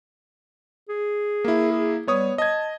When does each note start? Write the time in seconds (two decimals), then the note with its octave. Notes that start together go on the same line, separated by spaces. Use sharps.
0.89 G#4
1.44 A#3 E4
1.72 G#4
2.07 G3 B3 C#5 D#6
2.38 D#5 A5 G#6